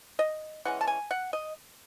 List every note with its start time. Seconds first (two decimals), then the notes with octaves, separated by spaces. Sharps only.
0.19 D#5
0.65 E3 G#3 C#4 F#5
0.81 A5
0.87 G#5
1.11 F#5
1.33 D#5